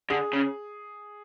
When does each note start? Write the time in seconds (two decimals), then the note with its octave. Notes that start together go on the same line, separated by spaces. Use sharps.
0.10 D3 G#4
0.33 C#3